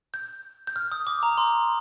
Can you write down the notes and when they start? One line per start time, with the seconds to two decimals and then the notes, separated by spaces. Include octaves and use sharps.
0.14 G6
0.67 G6
0.76 F6
0.92 D#6
1.07 D6
1.23 A#5
1.38 C6